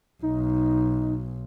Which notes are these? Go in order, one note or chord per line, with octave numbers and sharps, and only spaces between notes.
B1 D#4